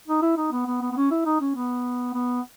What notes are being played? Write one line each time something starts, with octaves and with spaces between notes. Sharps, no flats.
D#4
E4
D#4
B3
B3
B3
B3
C#4
E4
D#4
C#4
B3
B3